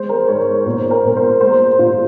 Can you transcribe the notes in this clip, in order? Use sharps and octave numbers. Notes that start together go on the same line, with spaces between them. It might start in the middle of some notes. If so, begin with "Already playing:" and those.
Already playing: G#3 C5
A#4
G#2 C#5
A#2 C5
A#4
A#2
C5
G#3 C5
A#2 F4